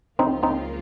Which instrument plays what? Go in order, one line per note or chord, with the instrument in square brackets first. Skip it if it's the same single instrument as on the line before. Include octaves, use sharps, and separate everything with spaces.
[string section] C#2 C#3 F3 A#3 F4 [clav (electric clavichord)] C4 D#4
[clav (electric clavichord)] C4 D#4